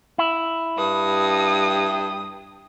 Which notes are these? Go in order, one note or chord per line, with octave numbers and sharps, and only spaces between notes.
E4
G2 D#6